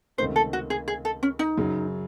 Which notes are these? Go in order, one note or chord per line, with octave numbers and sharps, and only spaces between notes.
C#2 C3 D#3 A3 C5
A4
F#4
G#4
G#4
A4
C#4
D#4
F#2 C#3 F#3